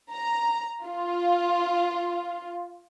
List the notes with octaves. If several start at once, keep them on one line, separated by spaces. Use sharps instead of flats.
A#5
F4